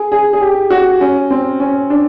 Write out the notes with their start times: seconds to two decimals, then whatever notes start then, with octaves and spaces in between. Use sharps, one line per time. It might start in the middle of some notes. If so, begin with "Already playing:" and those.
Already playing: G#4
0.12 G#4
0.33 G#4
0.41 G4
0.70 F#4
1.01 C#4
1.30 C4
1.60 C#4
1.90 D4